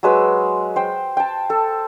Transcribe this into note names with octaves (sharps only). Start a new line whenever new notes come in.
F#3 G#3 B4 E6
C5 G5
G5 A5
A4